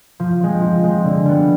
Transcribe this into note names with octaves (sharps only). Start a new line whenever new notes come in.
F3
G#3 C4
F3
G#3 C4
D3
G3 B3